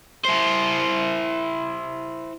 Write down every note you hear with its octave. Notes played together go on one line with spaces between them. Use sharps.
E4 C5